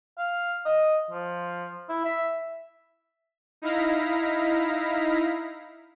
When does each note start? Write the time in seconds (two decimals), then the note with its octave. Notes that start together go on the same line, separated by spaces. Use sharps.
0.18 F5
0.66 D#5
1.11 F3
1.89 E4
2.05 E5
3.62 D#4 E4 F5 A#6 B6